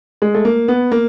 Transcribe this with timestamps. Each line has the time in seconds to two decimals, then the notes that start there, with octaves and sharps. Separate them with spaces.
0.22 G#3
0.35 A3
0.45 A#3
0.68 B3
0.92 A#3